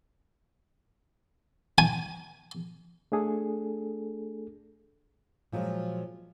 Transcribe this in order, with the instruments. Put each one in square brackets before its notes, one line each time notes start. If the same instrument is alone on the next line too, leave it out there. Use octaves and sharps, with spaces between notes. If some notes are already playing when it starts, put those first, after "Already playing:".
[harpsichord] G#5
[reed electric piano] A3 D4 G#4 A4
[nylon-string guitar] A#2 F3 F#3 G#3